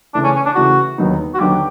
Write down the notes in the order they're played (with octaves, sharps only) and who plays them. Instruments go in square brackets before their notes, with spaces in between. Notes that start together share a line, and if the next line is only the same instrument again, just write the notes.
[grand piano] C#3 E3 A3 [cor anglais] D4
[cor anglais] C#4
C#4
D4
[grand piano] C#3 E3 A3 [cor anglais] F#4
[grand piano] D#2 D3 F#3 B3 D#4
[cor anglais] F#4
[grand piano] D#2 D3 F#3 B3 D#4 [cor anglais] G4